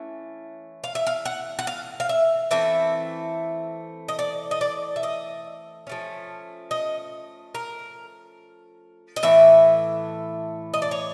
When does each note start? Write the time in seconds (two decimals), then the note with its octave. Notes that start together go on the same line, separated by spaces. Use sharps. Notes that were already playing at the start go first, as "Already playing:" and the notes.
Already playing: E3 A3 C#4
0.84 F5
0.95 E5
1.07 F5
1.25 F#5
1.59 F#5
1.67 F5
2.00 F5
2.09 E5
2.51 E3 A3 C4 E5
4.08 D#5
4.19 D5
4.51 D#5
4.61 D5
4.96 E5
5.03 D#5
5.87 F3 A3 C#4
6.71 D#5
7.55 A#4
9.16 D#5
9.23 A2 E3 A3 E5
10.74 D#5
10.82 D5
10.91 C#5